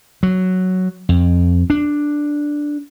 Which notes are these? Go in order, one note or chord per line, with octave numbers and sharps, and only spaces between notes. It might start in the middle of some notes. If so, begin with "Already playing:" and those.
F#3
F2
D4